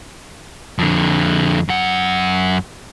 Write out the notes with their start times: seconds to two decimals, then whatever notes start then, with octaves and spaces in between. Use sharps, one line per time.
0.79 F2 D3
1.69 F#2 F#5